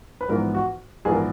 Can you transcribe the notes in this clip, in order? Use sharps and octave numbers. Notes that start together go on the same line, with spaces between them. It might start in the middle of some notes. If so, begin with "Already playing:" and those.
B4
A#1 G#2 E3 B3 A#4
F#4
A#1 G#2 E3 B3 G#4
A#4